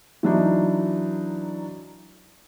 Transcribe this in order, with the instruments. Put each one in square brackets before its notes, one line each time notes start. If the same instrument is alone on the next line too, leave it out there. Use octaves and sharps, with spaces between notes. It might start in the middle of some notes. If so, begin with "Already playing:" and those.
[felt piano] E3 F#3 D4 D#4